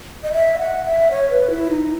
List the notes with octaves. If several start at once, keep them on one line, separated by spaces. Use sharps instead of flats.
D#5
E5
F#5
E5
C#5
B4
E4
D#4